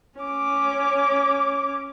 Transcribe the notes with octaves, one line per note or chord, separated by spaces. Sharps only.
C#4 D6